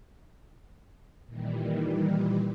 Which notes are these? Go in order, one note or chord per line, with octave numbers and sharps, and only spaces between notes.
A#2 D#3 E3 G3